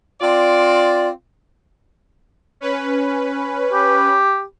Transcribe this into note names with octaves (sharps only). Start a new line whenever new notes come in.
C4 F4 D5
C#4 B4
G4